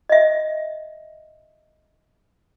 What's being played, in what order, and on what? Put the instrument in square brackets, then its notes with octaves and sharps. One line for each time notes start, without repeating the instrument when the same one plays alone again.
[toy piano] D#5 E5